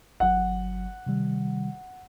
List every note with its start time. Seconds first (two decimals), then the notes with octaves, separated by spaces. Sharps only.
0.20 G1 F#3 F#5
1.06 C3 D#3 G3